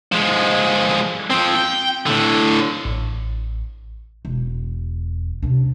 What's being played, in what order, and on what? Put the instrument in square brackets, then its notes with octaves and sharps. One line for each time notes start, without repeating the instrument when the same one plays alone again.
[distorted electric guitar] F3 G#3
F3 C4
G5
A2 D3
[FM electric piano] A1
[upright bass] E1
C3 D4